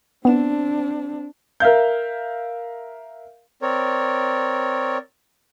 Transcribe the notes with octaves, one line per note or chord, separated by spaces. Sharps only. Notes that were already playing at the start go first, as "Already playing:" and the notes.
B3 C4 D4 E7
A#4 E5 F5 G6
C4 A#4 C#5 D5